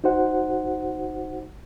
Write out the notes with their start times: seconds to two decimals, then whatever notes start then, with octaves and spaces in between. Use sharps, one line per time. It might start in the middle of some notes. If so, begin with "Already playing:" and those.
0.04 D#4 F#4 C5 F#5